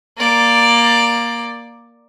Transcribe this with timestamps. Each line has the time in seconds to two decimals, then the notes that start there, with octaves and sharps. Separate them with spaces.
0.17 A#3 D5